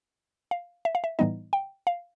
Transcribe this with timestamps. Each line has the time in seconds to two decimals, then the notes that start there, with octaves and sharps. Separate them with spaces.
0.51 F5
0.85 E5
0.95 F5
1.04 E5
1.19 A2 E3 G3 B3 D#4 D#5
1.53 G5
1.87 F5